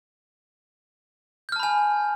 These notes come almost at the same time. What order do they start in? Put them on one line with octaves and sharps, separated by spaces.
G6 F6 A5 B5 G#5